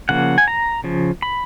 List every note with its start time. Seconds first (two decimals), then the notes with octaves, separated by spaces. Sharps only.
0.09 C#3 F3 A#3 F#5
0.38 G#5
0.48 A#5
0.84 C#3 F3
1.22 B5